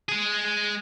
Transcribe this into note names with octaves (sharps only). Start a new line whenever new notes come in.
G#3 G#4